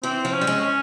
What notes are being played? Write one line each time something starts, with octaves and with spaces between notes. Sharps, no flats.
E3 C4
F3
C#4
G3
G#3
C#4